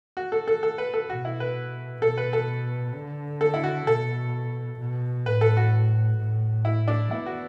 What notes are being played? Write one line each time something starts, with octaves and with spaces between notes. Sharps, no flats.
F#4
A4
A4
A4
B4
A4
B2 F#4
E4
B4
B2 A4
B4
A4
D3
A4
E4
F#4
B2 A4
B2
A2 B4
A4
F#4
A2
E4
D4
B3 E4
F#4